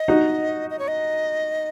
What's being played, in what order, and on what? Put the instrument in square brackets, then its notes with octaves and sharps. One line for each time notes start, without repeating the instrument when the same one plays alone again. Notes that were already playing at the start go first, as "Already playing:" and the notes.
Already playing: [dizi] D#5
[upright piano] D#4 F#4
[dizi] D#5
C#5
D#5